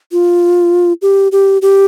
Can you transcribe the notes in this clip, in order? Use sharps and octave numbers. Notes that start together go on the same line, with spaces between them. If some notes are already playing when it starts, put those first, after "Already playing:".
F4
G4
G4
G4